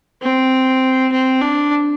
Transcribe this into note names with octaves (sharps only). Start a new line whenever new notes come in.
C4
C4
D4